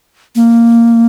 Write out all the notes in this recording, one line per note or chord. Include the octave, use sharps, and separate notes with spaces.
A#3